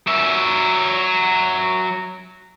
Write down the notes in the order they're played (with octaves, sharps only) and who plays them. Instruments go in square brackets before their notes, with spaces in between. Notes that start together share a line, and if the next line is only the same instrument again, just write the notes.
[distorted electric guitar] F#3 E5